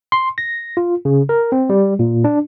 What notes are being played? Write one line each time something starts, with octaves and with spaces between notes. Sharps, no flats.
C6
A#6
F4
C#3
A#4
C4
G3
A#2
D4